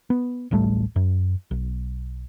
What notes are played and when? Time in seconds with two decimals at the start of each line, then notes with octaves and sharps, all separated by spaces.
0.10 B3
0.51 D1 A1 G3 A3
0.96 F#2
1.51 B1